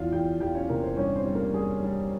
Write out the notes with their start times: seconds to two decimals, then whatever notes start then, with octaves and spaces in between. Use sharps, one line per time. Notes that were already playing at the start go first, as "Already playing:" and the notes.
Already playing: E2 F4 F5
0.12 E2 G4 G5
0.40 E2 G4 G5
0.55 C#4 C#5
0.69 C3 A#3 A#4
0.84 C4 C5
0.97 G2 C#4 C#5
1.16 C4 C5
1.25 G3
1.35 A#3 A#4
1.53 G3 G#4
1.82 G3